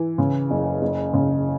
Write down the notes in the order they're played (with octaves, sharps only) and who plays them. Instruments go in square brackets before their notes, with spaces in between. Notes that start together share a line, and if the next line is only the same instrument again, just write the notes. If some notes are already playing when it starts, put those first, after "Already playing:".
Already playing: [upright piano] E3
C#3
F#1
F#1
C#3